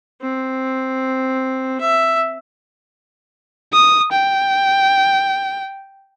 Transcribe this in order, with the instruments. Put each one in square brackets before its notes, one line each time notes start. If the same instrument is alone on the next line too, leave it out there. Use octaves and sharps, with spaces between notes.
[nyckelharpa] C4
E5
[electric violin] D#6
G5